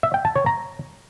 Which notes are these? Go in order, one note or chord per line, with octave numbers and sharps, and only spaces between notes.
E5
G5
A5
C#5
A#5